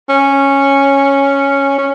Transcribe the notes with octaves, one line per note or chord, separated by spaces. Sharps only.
C#4
C#4